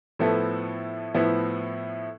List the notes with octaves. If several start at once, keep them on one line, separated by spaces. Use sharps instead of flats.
A2 F3 B3 E4 A4
A2 F3 B3 E4